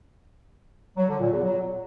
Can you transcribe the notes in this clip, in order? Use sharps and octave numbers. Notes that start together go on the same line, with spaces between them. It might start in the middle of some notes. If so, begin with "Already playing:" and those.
F#3
D3
A#2
E2
F#3